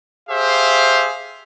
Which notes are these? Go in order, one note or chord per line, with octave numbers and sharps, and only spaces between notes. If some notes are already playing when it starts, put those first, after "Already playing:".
G4 G#4 C5 E5 F5